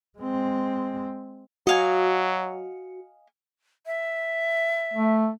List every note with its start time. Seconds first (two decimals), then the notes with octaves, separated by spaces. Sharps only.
0.18 G#3 C4
1.67 F#3 F#4 D#5 F5 G#5
3.86 E5
4.94 A3